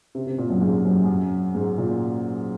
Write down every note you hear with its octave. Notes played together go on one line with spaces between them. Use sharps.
C3
C3
A#2
F#2
G#2
F#2
F#2
G#2
A#2